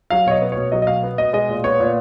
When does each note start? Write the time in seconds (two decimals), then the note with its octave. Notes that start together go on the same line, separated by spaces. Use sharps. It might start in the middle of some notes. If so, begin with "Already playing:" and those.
0.10 F#3 F5
0.26 B2 C#5
0.31 D#5
0.42 B3
0.52 B2 C#5
0.72 F#3 D#5
0.82 D#5
0.87 B2 F5
1.03 B3
1.18 B2 D#5
1.33 G#3 D#5
1.49 A#2
1.64 B3 C#5
1.80 A#2